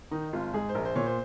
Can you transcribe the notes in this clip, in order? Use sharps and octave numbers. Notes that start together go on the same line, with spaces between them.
D#3 D#4
G#1 F4
G#2 G#4
C5
A#1 A#4
C5
A#2 C#5
C5